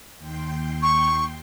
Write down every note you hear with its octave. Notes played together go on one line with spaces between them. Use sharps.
D#2 G5 C6
C#6